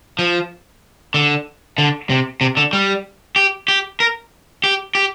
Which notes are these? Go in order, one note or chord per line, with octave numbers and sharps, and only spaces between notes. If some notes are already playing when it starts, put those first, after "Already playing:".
F3
D3
D3
C3
C3
D3
G3
G4
G4
A#4
G4
G4